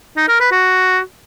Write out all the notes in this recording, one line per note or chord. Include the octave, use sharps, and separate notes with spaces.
D#4
A#4
B4
F#4